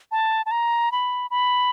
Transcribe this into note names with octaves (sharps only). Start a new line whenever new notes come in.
A5
A5
A#5
B5
B5